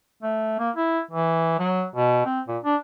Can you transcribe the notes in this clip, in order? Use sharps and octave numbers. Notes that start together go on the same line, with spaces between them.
A3
A#3
E4
E3
F#3
B2
C4
A#2
D4